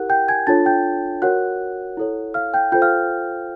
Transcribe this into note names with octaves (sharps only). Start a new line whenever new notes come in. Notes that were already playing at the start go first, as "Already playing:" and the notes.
Already playing: E4 G4 A#4 F#5 F#6
G5 G6
G#5 G#6
D4 F4 A4 C#5 A5 A6
G5 G6
F#4 A#4 C#5 F#5 F#6
E4 A4 C#5
F5 F6
G5 G6
F4 A4 C5 G5 G6
F5 F6